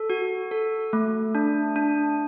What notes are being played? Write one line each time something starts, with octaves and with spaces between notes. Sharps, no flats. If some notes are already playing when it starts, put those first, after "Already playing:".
Already playing: A4
F#4
A4
A3
D4
D4